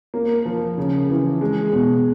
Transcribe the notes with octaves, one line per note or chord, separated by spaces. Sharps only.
A#3
F3
C#3
E3
G#3
B2